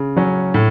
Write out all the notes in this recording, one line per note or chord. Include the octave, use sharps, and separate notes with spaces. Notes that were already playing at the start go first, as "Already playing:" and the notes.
Already playing: C#3
F#3 C#4
A2